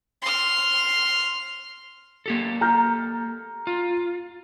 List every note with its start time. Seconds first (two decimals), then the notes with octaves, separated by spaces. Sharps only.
0.21 C6 F6
2.26 A#3 G4 A4
2.61 A#5 F6 G6
3.67 F4